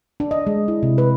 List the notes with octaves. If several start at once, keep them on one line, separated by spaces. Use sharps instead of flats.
D4
D#5
G#3
E4
C3
B4